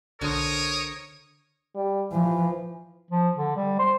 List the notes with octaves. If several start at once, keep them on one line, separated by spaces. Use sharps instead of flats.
B1 D3 A#4 C5 C#5 D#6
G3
E3 F3
F3
D3
G3
C5